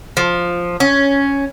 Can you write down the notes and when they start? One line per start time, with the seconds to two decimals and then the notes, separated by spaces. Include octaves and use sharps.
0.17 F3
0.80 C#4